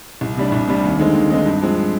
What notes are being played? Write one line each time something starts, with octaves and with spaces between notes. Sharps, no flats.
C2
C3 G3 D4
C2
C3 G3 D4
D#2
D3 G#3 C4 D#4
D#2
D3 G#3 C4 D#4
G2
F3 G#3 C4